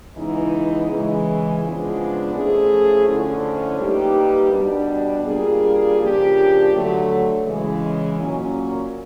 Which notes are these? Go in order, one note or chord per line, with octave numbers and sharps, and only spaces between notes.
C#3 E3 G#3 B3 D#4
C#3 E3 G#3
C#3 F3 G#3 B3 D4
F3 A3 C#4 E4 G#4
D3 F3 A3 C#4 E4
G3 A#3 D#4 G4 B4
B2 G3 B3 D4
G3 A#3 D4 F4 G#4
C#3 F3 A#3 D4 G4
D3 F#3 A3
C#3 E3 G#3
A#2 F#3 A#3 C#4